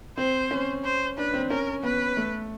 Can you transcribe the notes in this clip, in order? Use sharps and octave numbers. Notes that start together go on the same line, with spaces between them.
C4 C5
C#4
C5
D4 B4
C4
C#4 A#4
B3 B4
A3